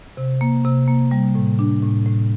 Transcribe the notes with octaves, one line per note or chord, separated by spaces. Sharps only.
C3
A#3
C3
A#3
G3
A2
D4
A2
A2